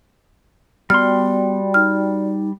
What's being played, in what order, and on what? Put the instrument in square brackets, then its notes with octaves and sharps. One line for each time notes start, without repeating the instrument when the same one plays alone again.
[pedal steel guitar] G3 C6 [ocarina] B3 [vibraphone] F#4 D5 G5 [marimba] F6
[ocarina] D#4 [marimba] F6